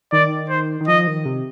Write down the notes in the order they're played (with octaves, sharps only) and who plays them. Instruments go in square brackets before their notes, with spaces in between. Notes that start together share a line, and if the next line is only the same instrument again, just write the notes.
[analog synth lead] D#3 [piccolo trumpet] D5
[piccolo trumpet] C5
[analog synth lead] D#3
[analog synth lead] F3 [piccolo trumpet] D#5
[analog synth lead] D#3
C3